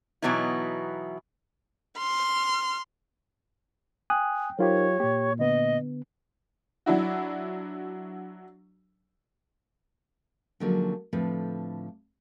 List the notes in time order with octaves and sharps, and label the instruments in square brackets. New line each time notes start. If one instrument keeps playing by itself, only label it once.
[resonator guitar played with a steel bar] B2 E3 F#3 B3 D#4 E4
[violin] C6 F6
[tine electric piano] G5 [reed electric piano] G#5 D#6 F#6
[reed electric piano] F#3 F4 G4 [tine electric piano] D#4 A#4 C5 [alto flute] C#5
[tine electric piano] A#2 A#3 [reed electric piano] G4
[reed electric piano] D3 B3 [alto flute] D#5
[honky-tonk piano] F#3 D4 E4 F#4
[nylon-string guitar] D3 F3 F#3 G#3 A#3 C#4
A2 D3 F3 C4 B4